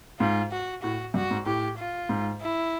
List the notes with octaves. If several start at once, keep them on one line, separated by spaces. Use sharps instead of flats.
G#2 F4
F#4
A2 F#4
G2 F#4
G#2
A2 G4
F4
G#2
E4